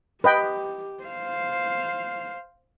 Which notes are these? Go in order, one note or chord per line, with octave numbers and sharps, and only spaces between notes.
G4 B4 D#5 G5
C5 F5